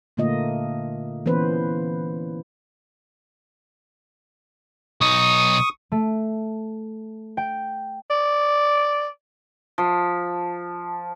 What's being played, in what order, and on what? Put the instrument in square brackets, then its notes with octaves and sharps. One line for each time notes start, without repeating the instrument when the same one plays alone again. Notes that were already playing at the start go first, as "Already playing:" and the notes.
[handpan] A#2 D3 A3 A#3 F4 D#5
E3 A#3 B3 C#4 B4 C5
[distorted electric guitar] B1 D#4 [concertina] C#6 D#6
[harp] A3
G5
[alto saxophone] D5
[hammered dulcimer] F3